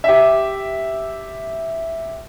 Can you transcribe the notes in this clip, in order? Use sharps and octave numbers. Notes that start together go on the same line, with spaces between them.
G4 E5